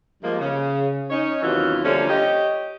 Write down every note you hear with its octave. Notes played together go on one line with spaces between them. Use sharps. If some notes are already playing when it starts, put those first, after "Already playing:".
F3 G3 G#3 A#3
C#3
C#4 D#4 C#5
D#2 C3 E3 F#3 C#4 F4
D3 F3 G3 A3 A#3 C#4
G4 C#5 D#5